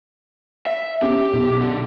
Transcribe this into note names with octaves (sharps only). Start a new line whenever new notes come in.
E5
C#4 G4
B1
D3